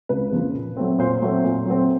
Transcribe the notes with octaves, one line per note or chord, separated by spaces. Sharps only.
C#2 B4
C#3 F3 A#3
A#2
F#3 A3 C4
A#2 C5
F#3 A3 C4
A#2
F#3 A3 C4